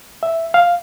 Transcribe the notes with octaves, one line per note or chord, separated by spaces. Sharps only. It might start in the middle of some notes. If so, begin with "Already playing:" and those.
E5
F5